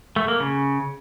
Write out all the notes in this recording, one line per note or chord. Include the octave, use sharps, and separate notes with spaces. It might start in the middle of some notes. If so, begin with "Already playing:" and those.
A3
A#3
C#3